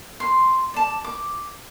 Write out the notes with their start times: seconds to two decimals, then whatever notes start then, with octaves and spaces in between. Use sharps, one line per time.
0.20 C6
0.74 D5 A5
1.04 D6